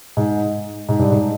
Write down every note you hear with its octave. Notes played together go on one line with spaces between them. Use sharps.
G#2
G#2
G2
G#2